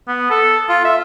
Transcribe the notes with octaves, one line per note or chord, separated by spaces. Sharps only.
B3
A4
F4
E5